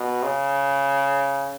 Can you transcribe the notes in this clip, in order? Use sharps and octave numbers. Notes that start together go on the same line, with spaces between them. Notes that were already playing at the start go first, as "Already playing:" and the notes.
Already playing: B2
C#3